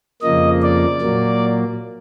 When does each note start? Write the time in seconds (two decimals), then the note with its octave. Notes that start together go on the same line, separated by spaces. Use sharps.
0.22 F2 C#3 F3 A#3 D#5
0.62 D5
1.01 A#2 F#3 A#3